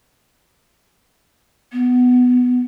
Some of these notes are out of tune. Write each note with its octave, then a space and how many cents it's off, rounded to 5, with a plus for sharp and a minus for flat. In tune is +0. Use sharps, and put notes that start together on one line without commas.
B3 +10